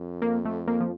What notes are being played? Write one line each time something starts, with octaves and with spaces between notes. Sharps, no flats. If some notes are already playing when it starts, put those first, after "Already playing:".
Already playing: F2
A#3
A3
A#3
F3